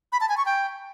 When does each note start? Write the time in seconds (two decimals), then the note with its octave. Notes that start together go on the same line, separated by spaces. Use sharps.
0.12 B5
0.21 A5
0.29 G#5
0.37 C#6
0.46 G5